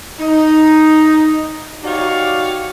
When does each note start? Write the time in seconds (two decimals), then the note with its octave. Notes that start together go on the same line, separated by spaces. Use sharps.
0.20 D#4
1.84 D#4 F#4 G4 C#5 D5 F5